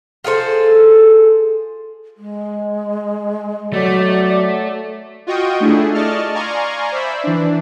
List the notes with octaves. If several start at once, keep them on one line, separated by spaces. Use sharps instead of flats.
F4 G#4 A4 C5
G#3
F#3 A3 D5
F4 F#4 D#5 G5 C#6 D#6
A3 D4 E4 G#4
D5 D#5 A5 C#6 F6
D5 F5 G#5 A#5 C6 C#6
C5 D5 E5 B5
E3 D4